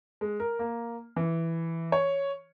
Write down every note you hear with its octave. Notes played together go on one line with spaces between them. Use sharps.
G#3
A#4
A#3
E3
C#5